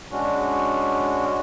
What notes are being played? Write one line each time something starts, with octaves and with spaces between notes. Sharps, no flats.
G#3 C#4 D4 F#4